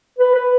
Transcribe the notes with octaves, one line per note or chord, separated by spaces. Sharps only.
B4
B4